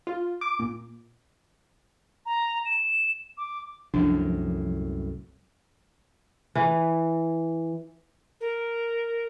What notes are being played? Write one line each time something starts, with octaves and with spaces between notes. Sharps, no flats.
F4
D6
A#2
A#5
E7
D6
C2 F#2 A2 F3 D4
E3
A#4